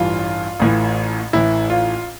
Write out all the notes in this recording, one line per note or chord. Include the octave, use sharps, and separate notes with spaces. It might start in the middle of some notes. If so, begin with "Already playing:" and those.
Already playing: A1 G2 E3 F4
A1 A2 E3
A1 A2 E3 E4
F4